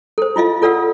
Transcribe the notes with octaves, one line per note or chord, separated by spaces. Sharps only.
A4 C5
E4 F4 D#5 F5
F4 A4 D5 F5 F#5 E6